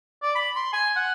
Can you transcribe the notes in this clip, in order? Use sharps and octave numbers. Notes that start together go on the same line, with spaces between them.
D5
B5
C6
G#5
F#5